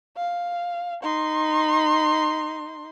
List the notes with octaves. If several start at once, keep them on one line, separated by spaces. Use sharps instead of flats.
F5
D#4 C6